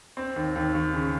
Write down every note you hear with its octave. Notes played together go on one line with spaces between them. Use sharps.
C4
D#2
D#2
D#2
C#3